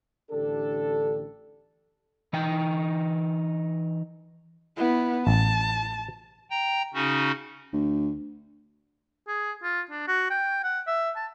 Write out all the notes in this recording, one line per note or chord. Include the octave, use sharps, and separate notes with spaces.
A1 D3 D4 G4 A4
E3 D#4 G5
B3 E4
A1 A5
G5 A#5
C#3 C#4 D#4 F#4
D2
G#4
F4
D4
F#4
G5
F#5
E5
A5